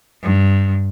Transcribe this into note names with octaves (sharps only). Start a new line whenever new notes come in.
G2